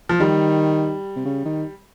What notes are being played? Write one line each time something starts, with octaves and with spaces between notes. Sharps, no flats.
F3
D#3 G3
C3
C#3
D#3